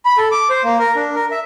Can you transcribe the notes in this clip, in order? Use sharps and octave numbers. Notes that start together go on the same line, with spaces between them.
B5
A4
D6
C5
A#3
A#4
D4
A#4
E5